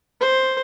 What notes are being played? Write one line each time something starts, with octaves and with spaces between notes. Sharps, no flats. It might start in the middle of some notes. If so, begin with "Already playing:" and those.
C5